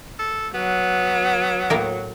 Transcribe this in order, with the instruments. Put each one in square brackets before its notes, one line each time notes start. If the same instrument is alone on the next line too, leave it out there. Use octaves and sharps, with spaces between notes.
[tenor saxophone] A4
[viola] F#3 [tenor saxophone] B3
[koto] A2 A#3 A#4